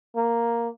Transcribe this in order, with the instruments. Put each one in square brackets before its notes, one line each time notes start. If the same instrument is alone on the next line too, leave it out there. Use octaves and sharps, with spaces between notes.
[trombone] A#3